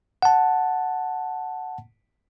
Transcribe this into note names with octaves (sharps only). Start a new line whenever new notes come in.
F#5 A5